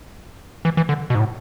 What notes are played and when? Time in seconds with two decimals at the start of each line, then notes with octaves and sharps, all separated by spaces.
0.65 E3
0.77 E3
0.89 D3
1.10 B2
1.15 G#2
1.20 A2